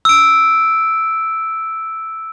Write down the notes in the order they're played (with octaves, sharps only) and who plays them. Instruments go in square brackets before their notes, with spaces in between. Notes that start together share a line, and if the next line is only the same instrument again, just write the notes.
[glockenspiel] E6 D7